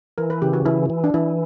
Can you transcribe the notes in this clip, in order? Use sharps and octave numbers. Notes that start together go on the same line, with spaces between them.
E3 A#4
B4
C#3 G4
F#4
E3 E4
E3
D4
E3 E4